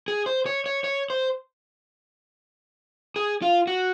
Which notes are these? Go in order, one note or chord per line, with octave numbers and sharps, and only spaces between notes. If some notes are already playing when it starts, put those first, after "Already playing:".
G#4
C5
C#5
C#5
C#5
C5
G#4
F4
F#4